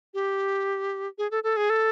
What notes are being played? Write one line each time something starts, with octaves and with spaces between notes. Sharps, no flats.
G4
G#4
A4
A4
G#4
A4